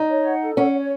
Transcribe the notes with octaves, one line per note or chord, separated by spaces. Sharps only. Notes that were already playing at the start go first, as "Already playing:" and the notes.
Already playing: D#4
C#5
F#5
A4
C#4 F#5
C#5